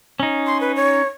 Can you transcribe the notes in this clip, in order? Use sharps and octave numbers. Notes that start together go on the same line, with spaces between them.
C#4 D#4
C6
B4
C#5